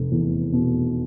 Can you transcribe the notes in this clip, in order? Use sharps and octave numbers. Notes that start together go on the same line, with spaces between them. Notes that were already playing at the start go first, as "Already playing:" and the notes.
Already playing: F1 A3
E2
B2